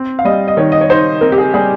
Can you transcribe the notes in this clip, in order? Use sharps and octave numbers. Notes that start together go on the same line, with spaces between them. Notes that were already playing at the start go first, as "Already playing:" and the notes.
Already playing: C4
F5
G3 D#5
D#5
D#3 C#5
D#5
C#5
D#4 C5
C4 A#4
G4
G#4
G3 G#4